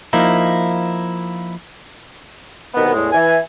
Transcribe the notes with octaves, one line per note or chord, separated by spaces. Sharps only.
F3 A#3 D#4 E4
C2 B2 D#3 B3
E2 A2 G#3
E3 G#5